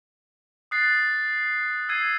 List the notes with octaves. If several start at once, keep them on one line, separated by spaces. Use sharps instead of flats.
D#6 F#6 A6 C7
E6 G#6 C7 D#7